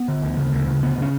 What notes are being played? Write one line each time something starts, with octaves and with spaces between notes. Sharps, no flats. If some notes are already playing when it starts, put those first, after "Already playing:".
Already playing: B3
D3
D2
C#3
D2
C#3
D2 B3
C#3 C#4